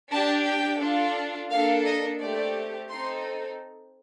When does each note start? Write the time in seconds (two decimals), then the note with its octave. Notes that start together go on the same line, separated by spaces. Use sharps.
0.12 D4 G4 A5
0.47 G5
0.81 D4 F4 A4
1.51 A#3 D4 A4 F5
1.86 D#5
2.20 A3 C4 G4 D5
2.90 C4 D#4 A4 C6